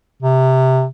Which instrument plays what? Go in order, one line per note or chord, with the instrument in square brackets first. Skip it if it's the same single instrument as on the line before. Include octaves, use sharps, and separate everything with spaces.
[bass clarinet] C3